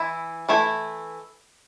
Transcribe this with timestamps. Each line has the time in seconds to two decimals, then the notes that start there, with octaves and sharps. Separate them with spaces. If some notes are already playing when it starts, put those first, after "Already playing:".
Already playing: E3 E4
0.49 E3 A3 E4